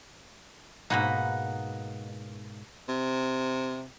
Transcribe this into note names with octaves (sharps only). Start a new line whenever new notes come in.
G#2 B2 A#3 D#4 F#5 B5
C3